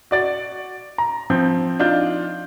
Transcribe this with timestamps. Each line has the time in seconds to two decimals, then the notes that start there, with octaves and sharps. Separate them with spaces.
0.11 F#4 D5 A6
0.98 A#5
1.30 F3 C4 G6
1.80 D4 D#4 F4 G6